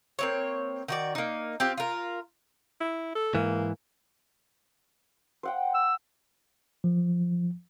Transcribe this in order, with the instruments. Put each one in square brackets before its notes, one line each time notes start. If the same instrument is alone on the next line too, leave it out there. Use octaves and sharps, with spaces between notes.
[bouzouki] A#3 C4 C#5
D#3 F#4 D5
A#3 D#4
C4 F4 G4
F4 A#4
[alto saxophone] E4
A4
[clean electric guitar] G#2 E3 [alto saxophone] A#3
[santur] C5 F#5 G5
[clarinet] E6
[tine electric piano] F3